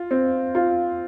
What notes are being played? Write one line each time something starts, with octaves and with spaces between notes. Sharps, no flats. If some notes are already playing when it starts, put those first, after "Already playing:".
Already playing: F4
C4
F4